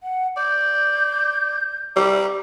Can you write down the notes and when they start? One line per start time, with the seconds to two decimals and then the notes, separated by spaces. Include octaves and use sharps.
0.03 F#5
0.37 D5 G6
1.96 G3 A#5